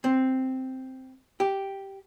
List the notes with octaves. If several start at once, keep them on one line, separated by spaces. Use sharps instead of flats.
C4
G4